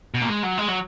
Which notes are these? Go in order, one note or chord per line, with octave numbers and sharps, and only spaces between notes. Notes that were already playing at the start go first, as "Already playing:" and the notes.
B2
A#3
G#3
F#3
G#3
F#3